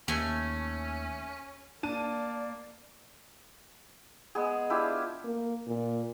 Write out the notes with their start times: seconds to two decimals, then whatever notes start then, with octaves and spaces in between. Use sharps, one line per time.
0.08 D#2 A3 C#4 G#5
1.83 A#3 D4 D5 A5 D#7
4.35 G#3 B3 G#4
4.70 D4 E4 F4 G4
5.24 A#3
5.68 A#2